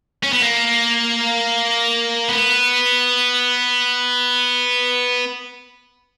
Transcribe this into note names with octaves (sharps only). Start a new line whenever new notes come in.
C#4
B3
A#3
B3